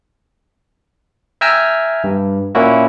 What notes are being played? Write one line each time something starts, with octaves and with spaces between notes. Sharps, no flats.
E5 G5 G#5 A#5 E6 F6
G2
A#2 A#3 C#4 E4 F#4